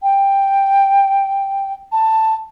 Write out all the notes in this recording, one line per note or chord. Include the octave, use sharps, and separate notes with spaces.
G5
A5